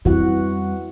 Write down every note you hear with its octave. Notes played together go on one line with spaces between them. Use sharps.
F2 E3 G3 F#4 F#5